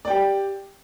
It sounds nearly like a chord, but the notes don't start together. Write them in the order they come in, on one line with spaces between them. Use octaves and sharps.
D5 G5 G4